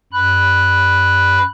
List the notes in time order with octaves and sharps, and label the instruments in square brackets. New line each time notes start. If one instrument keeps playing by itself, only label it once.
[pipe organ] F#2 B5 F#6